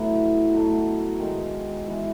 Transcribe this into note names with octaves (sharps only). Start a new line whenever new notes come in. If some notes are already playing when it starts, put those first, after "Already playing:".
Already playing: A2 F#3 B3 E4
B2 F#3 A3
D#3 G#3 D#4
E3 G#3 B3 E4